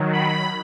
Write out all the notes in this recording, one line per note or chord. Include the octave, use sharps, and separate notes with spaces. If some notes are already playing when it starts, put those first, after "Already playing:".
Already playing: D#3 F#3
B5